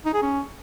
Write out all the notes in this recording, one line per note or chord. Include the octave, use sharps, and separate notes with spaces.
D#4
G#4
C#4